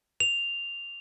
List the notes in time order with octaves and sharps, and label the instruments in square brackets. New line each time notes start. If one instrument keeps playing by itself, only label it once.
[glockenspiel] F7